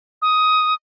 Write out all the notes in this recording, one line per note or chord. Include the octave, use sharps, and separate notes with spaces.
D#6